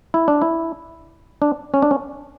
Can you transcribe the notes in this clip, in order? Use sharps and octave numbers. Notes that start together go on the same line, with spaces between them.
E4
D4
E4
D4
C#4
D4
C#4